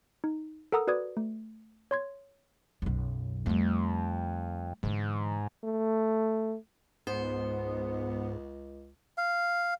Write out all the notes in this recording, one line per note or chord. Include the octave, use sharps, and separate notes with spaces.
D#4
A4 A#4 F#5 A#5 D#6 E6
F#4 B4 D5 D#6 G#6
A3
C#5 C6 G#6
B1 F#2
F2 G3 A3
G#2 D3 E3
A3
C#2 G#2 B3 C5
F5